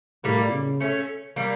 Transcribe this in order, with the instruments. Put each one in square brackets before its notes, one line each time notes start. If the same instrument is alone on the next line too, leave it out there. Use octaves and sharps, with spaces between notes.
[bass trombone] A2 [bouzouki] G3 A#3
[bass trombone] C#3
[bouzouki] A3 C#4
G3 A#3